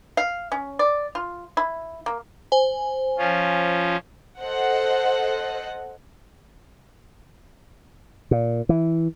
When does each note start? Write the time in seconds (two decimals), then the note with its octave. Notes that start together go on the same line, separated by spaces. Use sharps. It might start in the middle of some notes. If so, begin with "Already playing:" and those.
0.17 F5
0.52 C#4
0.79 D5
1.15 F4
1.57 E4
2.06 A#3
2.52 C5 G#5
3.18 F3 C#4 F4
4.40 A4 C5 D#5 F#5
8.31 A#2
8.69 E3